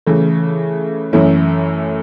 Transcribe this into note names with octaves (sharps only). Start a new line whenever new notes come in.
C#3 E3 A3
F#2 E3 A3 C#4 E4